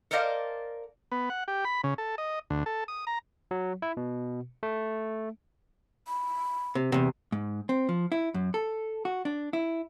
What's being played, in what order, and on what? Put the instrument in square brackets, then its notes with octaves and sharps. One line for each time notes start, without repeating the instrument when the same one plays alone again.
[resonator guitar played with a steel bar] A4 A#4 C5 D5 D#5 F5
[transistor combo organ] B3
F#5
G4
B5
C#3
A4
D#5
D2
A4
D#6
A#5
[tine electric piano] F#3
E4
B2
A3
[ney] B5
[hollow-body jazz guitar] C3
E2 C3
G#2
C4
F3
E4
F#2
A4
F#4
D4
E4